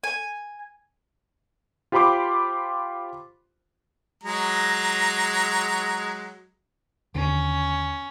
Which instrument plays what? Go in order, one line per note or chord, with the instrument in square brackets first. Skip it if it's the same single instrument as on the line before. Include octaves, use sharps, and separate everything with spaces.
[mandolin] G#5
[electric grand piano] F4 G4 C5 B5 C6 D6
[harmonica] F#3 G#3 A#5
[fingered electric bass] D#2 D3 [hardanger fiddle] C#4